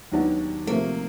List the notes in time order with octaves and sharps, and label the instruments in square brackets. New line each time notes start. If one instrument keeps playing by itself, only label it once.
[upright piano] D#2 D#3 F#3 B3 D4
[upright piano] C3 F3 A3 [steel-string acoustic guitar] A#3